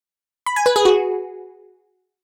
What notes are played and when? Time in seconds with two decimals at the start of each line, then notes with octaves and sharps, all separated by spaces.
0.46 B5
0.56 G#5
0.66 B4
0.76 G#4
0.85 F#4